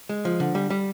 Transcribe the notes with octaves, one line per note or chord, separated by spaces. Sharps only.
G#3
F3
D3
G3
G3